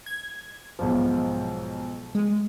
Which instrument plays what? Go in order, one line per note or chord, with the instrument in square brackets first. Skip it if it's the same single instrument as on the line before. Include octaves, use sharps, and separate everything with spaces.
[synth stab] G#6
[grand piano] B1 G#2 F3
[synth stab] G#3